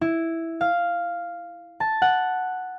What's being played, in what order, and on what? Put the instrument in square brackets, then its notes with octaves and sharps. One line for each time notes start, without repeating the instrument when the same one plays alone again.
[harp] E4
F5
A5
F#5